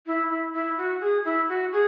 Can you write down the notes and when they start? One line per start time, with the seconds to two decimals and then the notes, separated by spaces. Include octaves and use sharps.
0.07 E4
0.30 E4
0.53 E4
0.78 F#4
1.01 G#4
1.25 E4
1.49 F#4
1.72 G#4